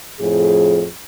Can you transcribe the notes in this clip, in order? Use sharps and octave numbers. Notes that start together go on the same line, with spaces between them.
F2 A2 F3 G#4